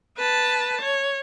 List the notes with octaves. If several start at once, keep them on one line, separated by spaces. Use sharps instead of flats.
B4 A5
C#5